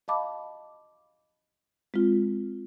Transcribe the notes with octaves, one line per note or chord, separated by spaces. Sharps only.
D#5 F5 A5 B5 D6
G#3 C4 F4